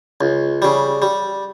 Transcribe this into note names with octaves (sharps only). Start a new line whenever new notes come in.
C#2
C#3 G3
G3